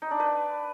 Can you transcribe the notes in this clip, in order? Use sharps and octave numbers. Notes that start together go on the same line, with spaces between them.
D#4
D4
B4